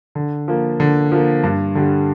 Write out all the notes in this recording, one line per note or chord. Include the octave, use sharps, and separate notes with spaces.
D3
F3 A#3
D3
F3 A#3
G2
D3 G3